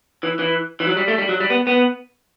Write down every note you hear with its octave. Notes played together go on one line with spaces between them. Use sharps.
E3
E3
E3
F#3
G3
A3
G3
F#3
G3
B3
B3